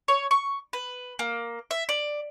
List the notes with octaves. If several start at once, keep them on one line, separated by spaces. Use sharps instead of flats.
C#5
C#6
B4
A#3
E5
D5